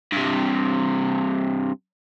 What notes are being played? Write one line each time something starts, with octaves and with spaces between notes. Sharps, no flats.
G2 C3